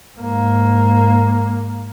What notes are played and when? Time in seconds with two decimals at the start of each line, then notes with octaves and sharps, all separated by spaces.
0.17 G#2 A#3